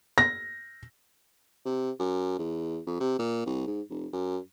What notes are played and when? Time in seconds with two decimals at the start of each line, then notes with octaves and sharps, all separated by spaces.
0.18 A#6
1.65 C3
1.99 F#2
2.39 E2
2.87 F2
3.00 C3
3.19 A#2
3.46 C2
3.67 G#2
3.90 F1
4.13 F#2